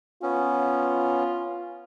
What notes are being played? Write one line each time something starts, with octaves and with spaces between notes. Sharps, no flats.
B3 C#4 F4